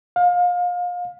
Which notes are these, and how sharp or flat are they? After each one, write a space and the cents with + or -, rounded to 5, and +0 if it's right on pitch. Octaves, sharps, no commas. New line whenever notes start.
F5 +30